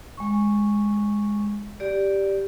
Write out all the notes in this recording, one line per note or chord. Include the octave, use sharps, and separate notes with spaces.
G#3 C#6
G4 D5